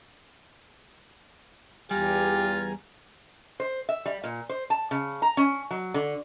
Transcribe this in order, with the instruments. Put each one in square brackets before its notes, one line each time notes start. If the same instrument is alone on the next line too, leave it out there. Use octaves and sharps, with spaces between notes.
[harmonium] E2 G#5 A#5 [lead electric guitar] G3 [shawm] F4 [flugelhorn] G4
[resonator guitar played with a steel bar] C5
E5
G3
A#2
C5
A5
C#3
A#5
C#4
F#3
D3